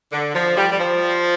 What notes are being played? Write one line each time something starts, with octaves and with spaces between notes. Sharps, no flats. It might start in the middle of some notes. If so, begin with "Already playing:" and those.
D3
F3
G3
G3
F3